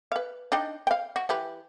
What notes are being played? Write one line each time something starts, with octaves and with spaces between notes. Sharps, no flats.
B4 F5
D4 D#4 G5
F5 G5
F#4
E3 G4 B4